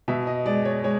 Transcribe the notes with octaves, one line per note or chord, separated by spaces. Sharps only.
B2 E5
D#5
G#3 D5
C#5
G#3 C#5